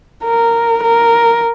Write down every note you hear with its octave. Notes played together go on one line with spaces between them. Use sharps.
A#4
A#4